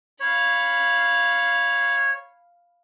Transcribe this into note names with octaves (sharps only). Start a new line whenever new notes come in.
C#5 F5 B5